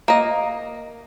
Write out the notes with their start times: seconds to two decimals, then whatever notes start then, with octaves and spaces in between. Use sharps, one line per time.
0.08 A#3 D#5